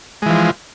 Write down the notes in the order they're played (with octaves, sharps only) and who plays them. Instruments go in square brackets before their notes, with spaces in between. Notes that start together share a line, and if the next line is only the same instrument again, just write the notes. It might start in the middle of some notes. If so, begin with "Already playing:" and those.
[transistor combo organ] G#3
E3
F3